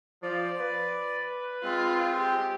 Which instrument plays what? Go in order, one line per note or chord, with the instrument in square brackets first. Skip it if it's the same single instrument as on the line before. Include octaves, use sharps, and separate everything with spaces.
[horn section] F3 [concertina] D5
[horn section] B4
[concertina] G#3 C4 [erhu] F4
[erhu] G4